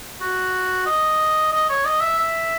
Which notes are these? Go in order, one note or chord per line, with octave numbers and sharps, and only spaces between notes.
F#4
D#5
D#5
C#5
D#5
E5
E5